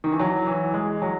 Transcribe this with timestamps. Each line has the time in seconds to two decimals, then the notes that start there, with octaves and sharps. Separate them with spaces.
0.04 D#3
0.12 E3
0.19 F#3
0.47 E3
0.74 G#3
1.02 F#3